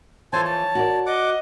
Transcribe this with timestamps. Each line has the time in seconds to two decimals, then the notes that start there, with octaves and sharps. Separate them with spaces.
0.33 E3 F3 A4 C5 C#5 G#5 A5
0.45 A5
0.75 F#4 A#4 D5
1.06 D#5 F#5 D6